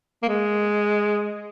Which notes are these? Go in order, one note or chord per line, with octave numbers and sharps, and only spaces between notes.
A#3
G#3